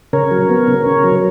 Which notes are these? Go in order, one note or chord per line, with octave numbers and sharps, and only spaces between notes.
C#3 A#4 C#5
F#3
B3
C#3
C#3
F#3